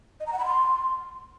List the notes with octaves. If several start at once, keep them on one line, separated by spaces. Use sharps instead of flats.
D#5
A#5
F#5
B5
C6